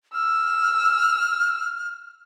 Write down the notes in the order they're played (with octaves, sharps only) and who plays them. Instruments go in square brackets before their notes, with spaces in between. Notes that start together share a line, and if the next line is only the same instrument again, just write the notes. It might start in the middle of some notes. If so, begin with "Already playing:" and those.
[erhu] E6 [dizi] F6